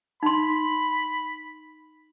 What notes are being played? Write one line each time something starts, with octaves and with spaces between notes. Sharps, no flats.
D#4 B5 C6